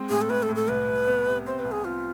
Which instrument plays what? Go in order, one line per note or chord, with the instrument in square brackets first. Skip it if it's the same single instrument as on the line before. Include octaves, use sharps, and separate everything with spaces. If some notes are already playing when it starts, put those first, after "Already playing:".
Already playing: [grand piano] G#3 C4
[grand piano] A2 [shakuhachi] G#4
[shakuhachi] A4
[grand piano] A2 [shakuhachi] B4
[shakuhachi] A4
[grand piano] A2
[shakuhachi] A4
[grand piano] C2 [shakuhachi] B4
[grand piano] C2
B3
C3
[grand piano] C4 [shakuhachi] C5
[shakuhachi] B4
[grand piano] C2
[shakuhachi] G#4
[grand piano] C4 [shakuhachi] F4